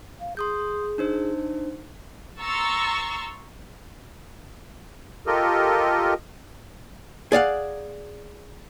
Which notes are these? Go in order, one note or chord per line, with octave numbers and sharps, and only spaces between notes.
F5
G#4 C6 D#6 G6
D4 D#4 C5
A#5 C6 C#6 E6 A6
F4 G4 A4 A#4 D#5
G#4 D5 F5 F#5